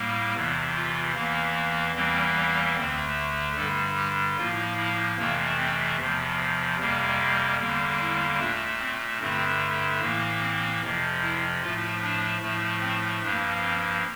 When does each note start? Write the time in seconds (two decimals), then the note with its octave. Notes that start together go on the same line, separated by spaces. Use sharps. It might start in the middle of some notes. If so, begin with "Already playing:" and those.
Already playing: A2 G3 A#3
0.34 E2 C3 E3
0.75 F4
1.15 E2 E3 A#3
1.95 E2 E3 G3 A#3 C4
2.76 D2 D3 A3 C4
3.56 G2 D3 G3 A4
3.96 G4
4.37 A2 F3 A#3 F4
4.77 E4
5.17 F2 C3 E3 A3 A#3
5.58 C4
5.98 E2 C3 F3
6.79 F2 C3 G3 A#3
7.59 E2 D3 G3 A#3
8.00 E4
8.39 A#2 A3 D4
8.80 C4
9.20 G2 D3 A3 C4
10.00 A2 E3 A#3
10.41 C4
10.82 F2 C3 F3
11.21 E4
11.61 A2 F3 A3 F4
12.02 D4
12.42 A2 F3 A3
12.82 C4
13.23 G2 F3 A#3 D4
13.63 C4